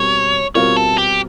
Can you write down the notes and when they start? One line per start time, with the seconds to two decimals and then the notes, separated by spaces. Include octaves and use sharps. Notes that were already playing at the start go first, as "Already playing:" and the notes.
Already playing: B2 G3 C4 A#4 C#5
0.55 B2 G3 C4 F4 A#4 C#5
0.76 A4
0.98 G4